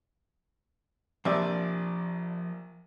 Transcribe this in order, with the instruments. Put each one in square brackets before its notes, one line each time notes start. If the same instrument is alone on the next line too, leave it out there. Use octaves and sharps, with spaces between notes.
[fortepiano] A#1 C3 D5 [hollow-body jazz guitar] F3 E5